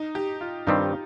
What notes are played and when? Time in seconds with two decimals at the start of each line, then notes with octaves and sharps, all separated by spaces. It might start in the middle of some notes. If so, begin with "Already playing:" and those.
Already playing: D#4
0.15 G4
0.41 F4
0.67 G2 D#3 G3 C4 D#4